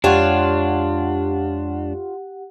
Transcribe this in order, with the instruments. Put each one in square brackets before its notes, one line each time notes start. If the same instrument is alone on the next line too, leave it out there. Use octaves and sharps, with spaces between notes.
[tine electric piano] F2 G#3 [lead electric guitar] D4 [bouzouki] F4 C#5 [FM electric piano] G4 F#5